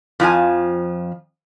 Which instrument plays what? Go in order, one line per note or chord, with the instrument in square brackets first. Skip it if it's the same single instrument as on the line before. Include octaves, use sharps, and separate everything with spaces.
[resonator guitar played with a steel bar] F2 F3 E4 G#5